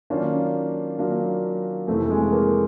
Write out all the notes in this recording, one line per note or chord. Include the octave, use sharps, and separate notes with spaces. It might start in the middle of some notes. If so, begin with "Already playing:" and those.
D#3 F#3 A#3 C#4 D4 F4
D#3 F#3 A#3 D4 F4
F2 C3 E3 A3
G#3
A#3